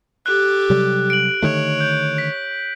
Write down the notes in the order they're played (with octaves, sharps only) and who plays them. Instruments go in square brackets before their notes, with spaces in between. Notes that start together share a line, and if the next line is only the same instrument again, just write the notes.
[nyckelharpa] G4 A4 [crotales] F#6
[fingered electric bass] C3 F#3 G3
[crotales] D7 F#7
[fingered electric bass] D3 D#3 A3 [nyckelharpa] C#5
[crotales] G6
B6